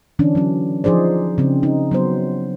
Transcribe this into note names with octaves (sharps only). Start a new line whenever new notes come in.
D3 E3 C#4 D4
F#3 C#4
F3 D#4 G#4 C5 D5
C#3 C4
D#4
F#3 B3 C5